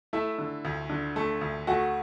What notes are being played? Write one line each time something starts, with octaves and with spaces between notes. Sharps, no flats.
A3 E4
D3
D2
D3
A3
D2
A3 F#4